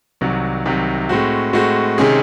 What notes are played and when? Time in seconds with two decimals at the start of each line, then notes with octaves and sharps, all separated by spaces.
0.21 C2 C3 D#3 F#3
0.66 C2 C3 D#3 F#3
1.09 A2 G#3 C4 F#4
1.53 A2 G#3 C4 F#4
1.98 C3 D#3 G#3 C#4 G#4